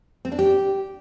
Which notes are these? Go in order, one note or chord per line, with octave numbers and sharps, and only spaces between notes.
C4
D4
G4